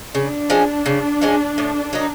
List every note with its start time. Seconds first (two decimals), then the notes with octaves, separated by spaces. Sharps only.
0.15 C#3 D4
0.50 F3 G#3 C#4
0.86 C#3
1.21 F3 G#3 C#4
1.58 A2
1.93 F#3 A#3 D#4